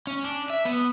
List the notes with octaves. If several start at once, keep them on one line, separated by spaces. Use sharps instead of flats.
C#4
D4
E5
B3